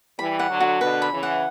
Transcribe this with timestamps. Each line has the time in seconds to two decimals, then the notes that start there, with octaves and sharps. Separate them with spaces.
0.19 E3 G3 B5
0.39 F#5
0.49 D3 F#3
0.60 F#4
0.81 B2 D3 B4
1.02 B5
1.11 C#3 E3
1.23 F#5